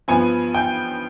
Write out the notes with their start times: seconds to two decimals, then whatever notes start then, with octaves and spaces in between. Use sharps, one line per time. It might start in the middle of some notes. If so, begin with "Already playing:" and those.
0.08 G2 F3 B3 G#5
0.54 G5